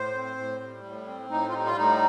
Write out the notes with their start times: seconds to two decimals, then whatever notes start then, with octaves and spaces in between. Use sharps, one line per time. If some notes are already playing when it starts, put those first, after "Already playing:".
Already playing: A2 C5
0.15 C4
0.37 A2
0.61 G3
0.84 A2
1.07 C4
1.30 A2 D#4
1.49 F4
1.53 G3 D#4
1.66 F4
1.77 A2 D#4